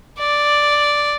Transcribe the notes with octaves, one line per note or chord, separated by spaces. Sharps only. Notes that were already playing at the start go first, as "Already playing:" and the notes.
D5